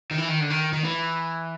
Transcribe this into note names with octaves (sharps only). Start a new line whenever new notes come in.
D#3
E3
D#3
D3
D#3
D#3
E3